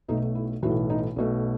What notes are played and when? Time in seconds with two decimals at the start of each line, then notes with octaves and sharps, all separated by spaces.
0.08 B1 B2 A3 D#4
0.35 E4
0.63 B1 A2 E3 F#4
0.90 D#4
1.16 B1 B2 A3